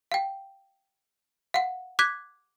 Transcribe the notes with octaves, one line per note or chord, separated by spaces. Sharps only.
F5 G5
F5 F#5
D6 F#6 G#6 B6